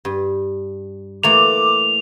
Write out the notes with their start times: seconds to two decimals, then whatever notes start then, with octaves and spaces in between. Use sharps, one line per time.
0.05 G2
1.23 E3 A3 A#3 D6 F7